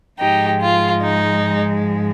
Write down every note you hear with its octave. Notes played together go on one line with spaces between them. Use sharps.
G#2 F3 G#3 D#4 G4
F4
D#4